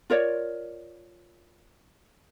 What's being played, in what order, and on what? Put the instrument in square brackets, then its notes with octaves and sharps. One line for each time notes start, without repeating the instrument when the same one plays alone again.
[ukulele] F4 A#4 C#5 D5